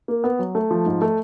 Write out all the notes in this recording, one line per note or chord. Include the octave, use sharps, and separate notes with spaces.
A#3
B3
F#3
A3
F3
G#2
A3